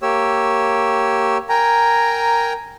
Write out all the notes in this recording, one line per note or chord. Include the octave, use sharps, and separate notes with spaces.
A#3 G4 C#5 E6
A#4 G5 G#5 A#5